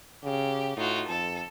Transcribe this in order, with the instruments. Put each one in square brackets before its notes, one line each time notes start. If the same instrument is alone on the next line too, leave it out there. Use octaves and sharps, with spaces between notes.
[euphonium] C#3 [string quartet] G4
[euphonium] A2 [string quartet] D#4 F4 F#4
[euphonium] F2 [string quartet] A4